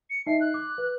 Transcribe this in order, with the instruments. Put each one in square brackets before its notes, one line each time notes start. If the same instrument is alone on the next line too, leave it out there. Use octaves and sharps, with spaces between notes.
[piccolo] C#7
[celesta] D#4 D#5 E5 [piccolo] C7
[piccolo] F#6
[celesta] D6
B4